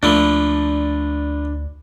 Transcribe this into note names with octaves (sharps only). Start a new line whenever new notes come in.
D2 F3 A3 A#3 D4 D5 B5